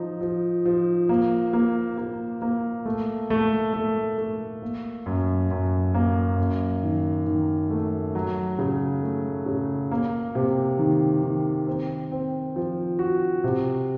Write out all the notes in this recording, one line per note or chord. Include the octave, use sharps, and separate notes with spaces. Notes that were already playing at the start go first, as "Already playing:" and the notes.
Already playing: F3 D#4
F3
F3
A#3
A#3
A#3
A#3
A3
A3
A3
A3
A#3
F#2
F#2
A#3
F#2
D#3
D#3
A3
F#3
C#3
A3
C#3
A#3
C3
D#3
D#3
C4
C4
F3
F#4
C3